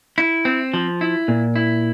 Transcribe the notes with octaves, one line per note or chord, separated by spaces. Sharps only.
E4
C4
F3
E4
A#2
E4